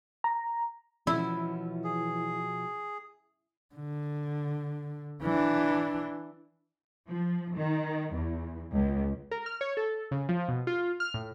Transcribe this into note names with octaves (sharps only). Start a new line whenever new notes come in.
A#5
B2 E3 F3 C#4 E4
G#4
D3
E3 D4
F3
D#3
E2
C#2
A#4
F6
C#5
A4
C#3
F3
B2
F4
F6
A2